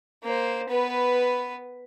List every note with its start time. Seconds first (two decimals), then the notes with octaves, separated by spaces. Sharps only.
0.24 A#3 C5
0.69 B3 B4